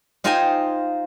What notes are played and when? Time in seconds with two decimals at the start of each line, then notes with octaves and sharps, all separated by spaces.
0.24 D#4 F4 C5 D#5 G5 G#5